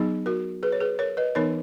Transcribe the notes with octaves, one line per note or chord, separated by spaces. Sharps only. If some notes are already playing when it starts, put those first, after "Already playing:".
Already playing: F#3 B3 D#4 G#4
F#4 A#4
G#4 B4
C#5
G#4 B4
A#4 C#5
B4 D#5
E3 B3 D#4 A#4 C#5